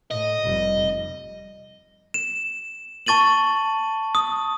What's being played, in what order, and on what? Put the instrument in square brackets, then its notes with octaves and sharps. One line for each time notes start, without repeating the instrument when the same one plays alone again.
[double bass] A2 [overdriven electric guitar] D#5
[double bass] F1 G3
[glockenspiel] E7
A5 C#6 A6 D#7 F#7
D#6